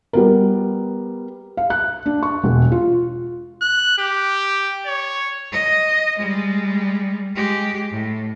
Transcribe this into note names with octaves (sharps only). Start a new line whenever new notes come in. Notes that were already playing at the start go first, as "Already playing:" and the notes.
G3 B3 A#4
F5
F#6
D4
C#6
E1
F4
F#6
G4
C#5
D#5
G3 G#3
G#3 G4
A2